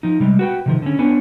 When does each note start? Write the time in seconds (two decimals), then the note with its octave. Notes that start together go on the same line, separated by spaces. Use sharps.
0.03 F3 D#4
0.20 C3 G3 G#3
0.39 F#4 B4 G5
0.66 C3 D#3 F3
0.82 D3 C#4
0.99 B3 D4 B4 C#5 G#5